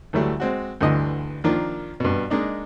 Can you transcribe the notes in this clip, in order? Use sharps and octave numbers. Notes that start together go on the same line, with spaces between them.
D2 E3 F#3 G3 A3
G#3 C4 F#4
D2 G2 D3 E3 D#5
D#3 F3 A#3 D4 F4
G2 B2
G#3 A#3 D4 D#4